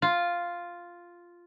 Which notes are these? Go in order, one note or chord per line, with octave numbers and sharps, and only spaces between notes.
F4